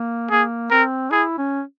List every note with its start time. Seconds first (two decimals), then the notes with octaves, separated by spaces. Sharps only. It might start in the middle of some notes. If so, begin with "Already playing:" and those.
Already playing: A#3
0.31 A#3 G#4
0.71 C4 A#4
1.11 E4 G#4
1.38 C#4